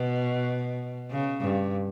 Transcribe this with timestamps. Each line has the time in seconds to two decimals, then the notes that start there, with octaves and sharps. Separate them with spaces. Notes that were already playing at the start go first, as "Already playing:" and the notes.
Already playing: B2
1.11 C#3
1.41 G2